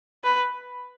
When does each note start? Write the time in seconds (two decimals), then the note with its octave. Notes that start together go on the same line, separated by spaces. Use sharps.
0.24 B4